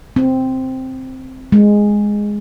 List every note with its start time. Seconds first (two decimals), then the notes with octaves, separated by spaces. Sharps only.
0.16 C4
1.52 G#3